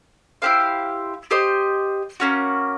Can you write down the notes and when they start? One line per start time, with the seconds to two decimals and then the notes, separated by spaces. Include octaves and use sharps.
0.42 E4 G4 C5 F5
1.31 G4 C5 D#5
2.20 A#3 C#4 F#4